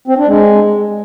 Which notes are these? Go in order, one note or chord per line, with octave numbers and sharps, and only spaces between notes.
C4
D4
G#3